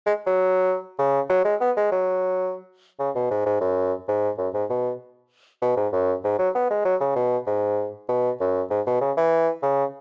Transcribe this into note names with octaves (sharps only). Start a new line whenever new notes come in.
G#3
F#3
C#3
F#3
G#3
B3
G#3
F#3
C#3
B2
G#2
G#2
F#2
G#2
F#2
G#2
B2
B2
G#2
F#2
G#2
F#3
B3
G#3
F#3
C#3
B2
G#2
B2
F#2
G#2
B2
C#3
E3
C#3